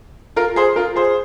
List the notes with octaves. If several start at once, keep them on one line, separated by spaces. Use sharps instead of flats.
F4 A#4
G#4 C5
F4 A#4
G#4 C5